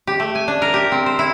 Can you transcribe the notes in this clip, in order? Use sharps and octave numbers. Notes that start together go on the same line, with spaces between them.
G4
A3
G#5
D4
A#4
G4
C4
C5
E4